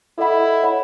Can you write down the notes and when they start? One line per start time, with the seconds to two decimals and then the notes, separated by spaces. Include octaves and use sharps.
0.18 E4 A4 D#5 F#5 B5
0.63 C#5 F#5 B5